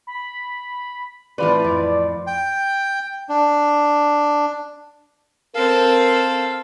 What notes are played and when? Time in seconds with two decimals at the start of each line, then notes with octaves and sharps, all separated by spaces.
0.07 B5
1.38 A2 E3 C4 F4 B4 D5
1.64 F2 D7
2.27 G5
3.29 D4
5.55 C4 A4 A#4 F5